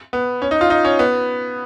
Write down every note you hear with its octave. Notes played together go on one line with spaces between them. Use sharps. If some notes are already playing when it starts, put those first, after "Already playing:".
B3
C#4
D#4
F4
D#4
C#4
B3